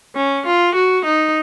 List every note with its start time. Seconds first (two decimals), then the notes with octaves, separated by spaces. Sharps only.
0.15 C#4
0.46 F4
0.75 F#4
1.05 D#4